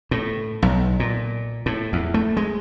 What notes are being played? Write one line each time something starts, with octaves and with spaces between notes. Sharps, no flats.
A2
B1
A#2
A2
E2
A3
G#3